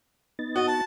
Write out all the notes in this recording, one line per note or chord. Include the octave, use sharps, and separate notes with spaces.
B3 D#4 A6
F#4 D#5
A5